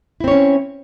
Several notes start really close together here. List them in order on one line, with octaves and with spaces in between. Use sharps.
E4 C4 C#5 C#4